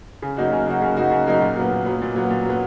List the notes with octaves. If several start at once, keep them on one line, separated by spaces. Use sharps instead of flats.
C#3
F#3 A#3 D#4 F#4
C#3
F#3 A#3 D#4 F#4
C#3
F#3 A#3 D#4 F#4
C#3
F#3 A#3 D#4 F#4
A#2
F#3 B3
A#2
F#3 B3
A#2
F#3 B3
A#2
F#3 B3